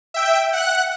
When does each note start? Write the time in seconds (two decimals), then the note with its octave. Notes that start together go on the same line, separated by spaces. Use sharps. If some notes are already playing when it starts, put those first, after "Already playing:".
0.14 E5 G5
0.53 F#5 F#6